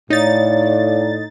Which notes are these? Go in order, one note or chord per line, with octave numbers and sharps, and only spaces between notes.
A2 D#4 C#5 D5 F5 A6